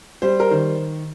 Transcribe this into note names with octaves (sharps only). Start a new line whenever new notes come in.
G3 C5
A#4
D#3 C5